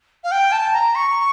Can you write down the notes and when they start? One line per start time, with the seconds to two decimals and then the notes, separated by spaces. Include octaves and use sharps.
0.24 F5
0.32 G5
0.52 A5
0.73 A#5
0.95 C#6